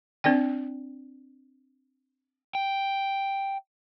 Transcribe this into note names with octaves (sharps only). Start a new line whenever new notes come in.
C4 D4 D5 G5
G5